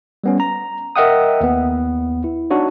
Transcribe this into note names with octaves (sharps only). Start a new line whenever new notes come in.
G3 B3 C#4
A#5
A#4 D#5 E5 F#5 G5 D#6
D#2 B3
E4
D4 D#4 F#4 C#5